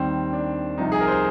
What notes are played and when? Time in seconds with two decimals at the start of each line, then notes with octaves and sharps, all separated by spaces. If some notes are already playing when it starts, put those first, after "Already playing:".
Already playing: D#2 D#3 G3 C4
0.33 D4
0.78 C2 C3 F3 D#4
0.92 G#4
1.00 A#4
1.08 C5